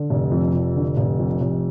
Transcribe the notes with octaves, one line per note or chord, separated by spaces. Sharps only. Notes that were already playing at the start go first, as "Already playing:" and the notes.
Already playing: D3
F1
F2
F1
D3
F1
F2
F1